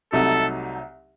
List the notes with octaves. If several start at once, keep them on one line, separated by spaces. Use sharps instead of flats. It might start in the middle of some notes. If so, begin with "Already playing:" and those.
C2 C3 F#3 A3 D#4 A4